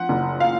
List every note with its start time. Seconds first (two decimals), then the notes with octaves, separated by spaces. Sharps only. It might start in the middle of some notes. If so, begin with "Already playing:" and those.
Already playing: F3 F#5
0.09 F#1
0.40 F5